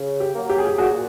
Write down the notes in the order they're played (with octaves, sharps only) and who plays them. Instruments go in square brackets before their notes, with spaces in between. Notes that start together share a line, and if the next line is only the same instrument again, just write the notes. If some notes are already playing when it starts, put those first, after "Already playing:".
Already playing: [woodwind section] C#3
[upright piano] G4
[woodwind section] F#3 A#3
[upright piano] G4
G#4
G4
[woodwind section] A#2 [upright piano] F#4 G#4